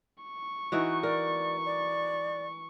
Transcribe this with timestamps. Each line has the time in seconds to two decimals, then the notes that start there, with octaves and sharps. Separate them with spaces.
0.24 C#6
0.72 E3 D#4 F#4
1.03 A#4 D5
1.65 D5